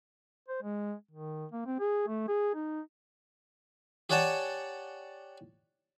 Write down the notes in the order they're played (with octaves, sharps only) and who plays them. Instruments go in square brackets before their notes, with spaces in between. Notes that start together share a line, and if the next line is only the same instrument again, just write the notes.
[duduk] C5
G#3
D#3
A#3
C4
G#4
A3
G#4
D#4
[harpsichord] G4 C#5 D5 F#5 G#5 A5